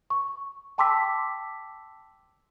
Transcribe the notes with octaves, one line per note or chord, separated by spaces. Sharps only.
C#6
G5 A5 C6 D6 E6 B6